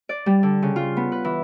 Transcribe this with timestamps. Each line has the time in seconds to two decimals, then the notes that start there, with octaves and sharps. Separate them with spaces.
0.09 D5
0.26 G3
0.43 D3
0.62 C#3
0.76 F4
0.97 B3
1.12 B4
1.25 E3